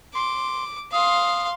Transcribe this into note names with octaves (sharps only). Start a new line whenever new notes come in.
C6 D6
F5 C6 D#6